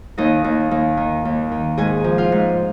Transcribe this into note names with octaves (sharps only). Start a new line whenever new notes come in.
D#2 D#4 D#5
D#2
D#2
D#3
D#2
D#3
G#2 G#4 G#5
F3
F4 F5
G#2